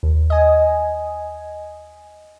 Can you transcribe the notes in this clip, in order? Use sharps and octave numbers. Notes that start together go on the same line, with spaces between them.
D#2
D#5 G#5